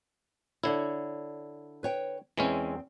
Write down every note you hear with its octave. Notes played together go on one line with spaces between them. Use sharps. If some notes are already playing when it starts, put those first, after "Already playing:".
D3 E4 C#5 D5
B4 C#5 G5
E2 E3 G#3 C4 C#4